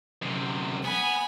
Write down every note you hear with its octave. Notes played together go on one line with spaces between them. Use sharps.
F#2 C3
B3 G#5 B5